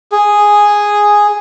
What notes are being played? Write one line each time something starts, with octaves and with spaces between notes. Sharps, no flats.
G#4